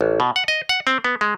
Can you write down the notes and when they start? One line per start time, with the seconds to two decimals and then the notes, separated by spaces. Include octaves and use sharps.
0.01 A1
0.20 B2
0.36 F#5
0.48 D#5
0.69 F#5
0.87 C4
1.04 B3
1.21 G#3